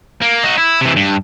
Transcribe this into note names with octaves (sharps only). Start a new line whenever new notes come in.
A#3
D#4 F#4
E4
C3 E3
G2